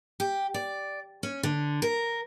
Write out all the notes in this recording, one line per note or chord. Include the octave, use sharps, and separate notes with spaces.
G4
D5
C#4
D3
A#4